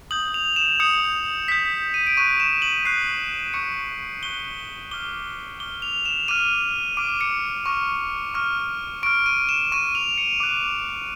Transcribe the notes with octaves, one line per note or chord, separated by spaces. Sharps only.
D#6 G6 F#7
F7
E7
D#6 G6 C#7
D#6 G6 B6
D#7
D7
C#6 F#6 D#7
E7
F#7
C#6 F#6 C7
C#6 F#6 C#7
C#6 F#6 G7
D6 F6 G7
D6 F6 G7
F7
E7
D6 F6 D#7
D6 F6 D7
C#7
C#6 F6
C#6 F6
C#6 F6 D7
D#7
E7
C#6 F6 D#7
F7
C#7
D6 F#6